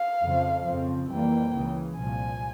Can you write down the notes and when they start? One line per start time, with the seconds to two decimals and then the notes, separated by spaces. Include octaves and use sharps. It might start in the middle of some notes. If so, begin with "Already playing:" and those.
Already playing: F5
0.23 F2 C#3 F3
0.66 F2 C#3 F3 C4
1.10 F2 E3 G3 A#3 G5
1.54 C#2 C#3 E3
1.98 C2 A#2 F3 G#5